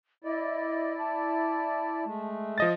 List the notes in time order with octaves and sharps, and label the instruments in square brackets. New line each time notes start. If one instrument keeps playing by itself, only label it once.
[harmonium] E4 D5 [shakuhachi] D#5
[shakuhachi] A5
[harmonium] G#3 A3
[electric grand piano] F3 D#5 A6